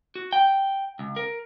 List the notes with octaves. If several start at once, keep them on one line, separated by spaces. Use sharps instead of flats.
F#4
G5
C#2
A#4